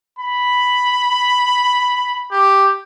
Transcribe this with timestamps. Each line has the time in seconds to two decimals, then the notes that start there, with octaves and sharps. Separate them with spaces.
0.19 B5
2.31 G4